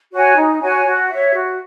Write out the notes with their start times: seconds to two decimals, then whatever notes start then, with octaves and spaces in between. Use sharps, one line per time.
0.12 F#4 C#5 G#5
0.37 D#4
0.61 F#4 C#5 G#5
0.85 F#4
1.10 C#5 E5
1.33 F#4